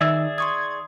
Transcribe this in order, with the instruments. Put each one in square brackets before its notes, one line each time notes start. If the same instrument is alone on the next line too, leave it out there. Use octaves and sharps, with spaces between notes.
[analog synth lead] D#3 [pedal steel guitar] G#4 D5 E6 [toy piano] E5
[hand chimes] C6 C#6 D#6 [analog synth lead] G#6